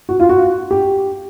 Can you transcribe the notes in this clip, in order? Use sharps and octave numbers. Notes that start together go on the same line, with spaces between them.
F#4
F4
F#4
G4